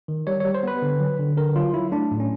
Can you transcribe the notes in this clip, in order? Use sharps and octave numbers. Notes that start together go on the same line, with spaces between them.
D#3
G3 C#5
G3 C#5
C5
B3 B4
D3
F#3
D3
D3 A#4
F#3 F4
F#3 E4
A3 D4
A2
C#4